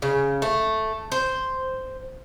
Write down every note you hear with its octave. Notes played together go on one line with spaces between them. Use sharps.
C#3
A3
C5